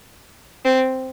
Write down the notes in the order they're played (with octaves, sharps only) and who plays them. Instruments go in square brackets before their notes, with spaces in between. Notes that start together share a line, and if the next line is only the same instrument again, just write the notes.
[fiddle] C4